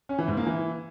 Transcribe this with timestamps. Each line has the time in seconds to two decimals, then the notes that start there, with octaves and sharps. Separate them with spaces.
0.09 C#4
0.19 E3
0.28 G#2
0.37 A#3
0.46 E3